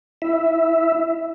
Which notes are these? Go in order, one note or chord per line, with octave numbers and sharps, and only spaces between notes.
E4 E5